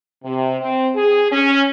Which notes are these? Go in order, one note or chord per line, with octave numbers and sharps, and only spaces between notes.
C3
C4
G#4
C#4